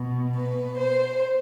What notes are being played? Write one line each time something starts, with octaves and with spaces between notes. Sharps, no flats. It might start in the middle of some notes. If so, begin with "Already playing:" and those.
Already playing: B2
B4
C5